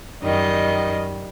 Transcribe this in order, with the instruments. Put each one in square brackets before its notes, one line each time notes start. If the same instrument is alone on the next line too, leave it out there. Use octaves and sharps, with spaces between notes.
[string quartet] F#2 D#3 G3 D#5